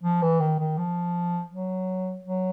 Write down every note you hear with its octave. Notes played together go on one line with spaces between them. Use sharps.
F3
E3
D#3
D#3
F3
F#3
F#3